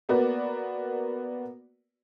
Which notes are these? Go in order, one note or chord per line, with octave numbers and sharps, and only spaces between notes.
A#3 B3 F#4 B4 D5